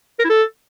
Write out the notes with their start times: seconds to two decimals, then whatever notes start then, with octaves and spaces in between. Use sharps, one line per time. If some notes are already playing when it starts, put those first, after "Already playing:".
0.19 A#4
0.24 E4
0.30 A4